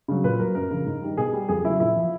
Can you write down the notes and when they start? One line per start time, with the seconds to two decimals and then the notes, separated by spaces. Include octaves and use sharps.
0.08 C#3 F#3
0.24 A#2 B4
0.39 F#3 A#4
0.55 F#2 A#4
0.71 C#3 F3
0.86 G#2
1.02 D#3 G3
1.17 B2 G#4
1.33 G3
1.49 F2 G#4
1.64 C#3 F#3 E4
1.80 A#2 E4
1.96 F3